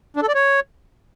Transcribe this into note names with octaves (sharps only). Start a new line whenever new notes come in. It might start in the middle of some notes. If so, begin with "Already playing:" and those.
D4
A4
D5
C#5